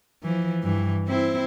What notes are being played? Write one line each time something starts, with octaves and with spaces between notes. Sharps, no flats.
E3 F3
G2 E3
C4 E4